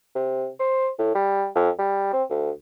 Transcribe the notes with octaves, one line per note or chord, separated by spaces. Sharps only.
C3
C5
A2
G3
F2
G3
C4
D2